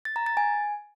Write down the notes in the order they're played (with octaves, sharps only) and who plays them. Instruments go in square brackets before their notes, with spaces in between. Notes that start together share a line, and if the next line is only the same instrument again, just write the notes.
[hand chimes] A6
A#5
A6
G#5